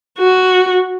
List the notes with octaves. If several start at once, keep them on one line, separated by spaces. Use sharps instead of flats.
F#4